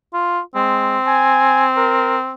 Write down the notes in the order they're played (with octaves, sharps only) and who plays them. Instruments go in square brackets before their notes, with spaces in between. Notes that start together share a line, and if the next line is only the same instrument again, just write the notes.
[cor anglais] F4
[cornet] G#3 [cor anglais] C4
[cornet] G#5
A#4